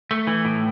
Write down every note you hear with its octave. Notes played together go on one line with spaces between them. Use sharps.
A3
E3
A2